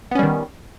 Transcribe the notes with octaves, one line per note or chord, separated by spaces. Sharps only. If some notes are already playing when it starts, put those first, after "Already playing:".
D#3 G3 B3 C#4